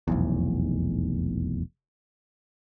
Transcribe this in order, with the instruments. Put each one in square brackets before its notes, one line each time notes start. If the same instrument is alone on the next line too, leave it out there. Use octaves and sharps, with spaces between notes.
[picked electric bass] F1 B1 E2